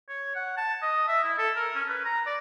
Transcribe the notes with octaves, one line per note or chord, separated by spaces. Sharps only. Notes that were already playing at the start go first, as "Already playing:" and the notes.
C#5
F#5
A5
D#5
E5
E4
A4
A#4
C#4
B4
A#5
D5